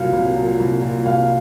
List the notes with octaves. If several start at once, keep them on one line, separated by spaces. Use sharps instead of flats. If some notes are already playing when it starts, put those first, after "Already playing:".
Already playing: C2 A#2 F#3 F5
C2
A#2 F#3
C2
A#2 F#3
C2 F5